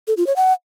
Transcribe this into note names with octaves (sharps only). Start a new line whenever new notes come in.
A4
F4
C#5
F#5